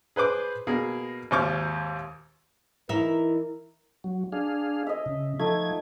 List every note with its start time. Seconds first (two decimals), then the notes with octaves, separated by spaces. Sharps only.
0.16 G#4 B4 C5 D6
0.67 B2 A#3 G#4
1.31 G#1 D#2 C5 C#6 D6 F6
2.89 E3 D#4 A#4 E5
4.04 F#3
4.32 D4 G#4 F5
4.87 D#5 E5
5.06 C#3
5.39 F3 A3 D#4 G#6